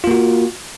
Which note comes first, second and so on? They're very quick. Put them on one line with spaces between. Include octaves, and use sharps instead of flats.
F4 A#3 F#4